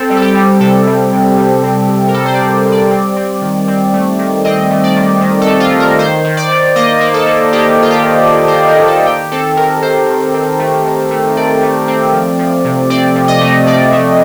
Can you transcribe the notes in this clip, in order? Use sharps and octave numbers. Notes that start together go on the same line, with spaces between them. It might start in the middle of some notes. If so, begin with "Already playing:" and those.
Already playing: C4 A4
G3
A4
G4
G3
C3 A4
G3
C3
G3
C4
C3
A#4
G3 A4
C5
D5
C3
G3
D5
C4
C4
D#3
C4
A3
D#3
C4 D#5
A3
D5
D#3
D#3
A4
A3
F4
D#3
A#4
D#3 C5
D#3
D5
D#3
A#3 D#5
A#3
A4
A#3
A#3 G4
D#3 F4
G4
D#3
A#3
C5
D#3
A#4
D#3
A4
D#3 G4
C4 A4
D#3 A#4
D#3 C5
D#3
C4
A3
D#3
A3
D#3 D5
A3
C4
F3
F3
C3
C4 D5
F3
D#5
A3
F3 D5
A3